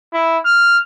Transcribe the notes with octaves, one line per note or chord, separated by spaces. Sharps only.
E4
F6